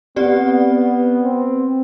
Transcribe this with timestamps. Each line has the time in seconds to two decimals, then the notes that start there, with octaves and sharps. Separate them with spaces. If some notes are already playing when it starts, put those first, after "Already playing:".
0.16 B3 C4 G4 D5
0.70 B3
1.23 C4